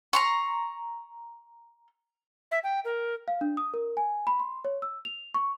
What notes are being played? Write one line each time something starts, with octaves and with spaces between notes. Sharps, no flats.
A#5 C6 C#6
E5
G5
A#4
F5
D4
D#6
A#4
G#5
B5
C6
C#5
E6
F7
C#6